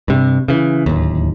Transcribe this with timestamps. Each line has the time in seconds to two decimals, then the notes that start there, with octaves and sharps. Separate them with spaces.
0.08 G2 C3
0.48 C#3 E3
0.86 D1 D#2